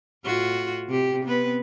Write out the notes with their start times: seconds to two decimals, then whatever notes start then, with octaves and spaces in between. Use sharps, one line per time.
0.24 A2 F4 F#4
0.88 C3 G4
1.24 B3 C4 B4